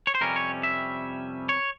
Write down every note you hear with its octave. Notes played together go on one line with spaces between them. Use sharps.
C#5
C5
F2 C3 G3 C#4 A#4
C#5
E5
C#5